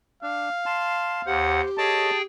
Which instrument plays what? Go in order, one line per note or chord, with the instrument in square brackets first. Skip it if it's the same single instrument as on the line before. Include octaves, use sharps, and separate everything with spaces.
[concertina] D4 [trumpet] F5
[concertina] A5 C6
[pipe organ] D#2 F#5 [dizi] G4 [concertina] C5
[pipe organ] G#4 G5 [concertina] A4 C#5 D#5 [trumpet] A5